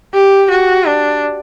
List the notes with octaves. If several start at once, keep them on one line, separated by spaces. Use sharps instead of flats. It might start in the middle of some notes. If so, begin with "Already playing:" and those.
G4
F#4
D4